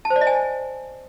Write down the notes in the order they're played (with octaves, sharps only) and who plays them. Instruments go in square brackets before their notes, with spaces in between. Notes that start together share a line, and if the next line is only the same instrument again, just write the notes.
[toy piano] A5
C5
D5
D#5
G#5